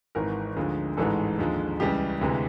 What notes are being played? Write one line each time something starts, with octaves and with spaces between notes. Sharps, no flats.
G#1 G#2 E3 A#4
D2 D3 F3 G#3
A1 G#2 E3 G#3 A4
D#2 D3 F3 G#3
C#2 C#3 E3 G3 G4
D2 C3 E3 G#3